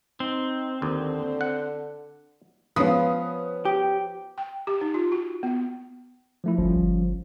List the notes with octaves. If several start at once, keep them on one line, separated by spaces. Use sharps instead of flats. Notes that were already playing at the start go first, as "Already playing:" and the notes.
C4 D#4
D#2 D3
F#5
F3 B3 C#4 B4 D#6
G4
G5
G4
D#4
F4
F#4
B3
F3 A3 E4
G1 F3 G3 C#4
G1